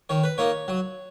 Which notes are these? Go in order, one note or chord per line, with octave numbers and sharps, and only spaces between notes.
D#3 C#5
B4
A#3 D#4 C#5
F#3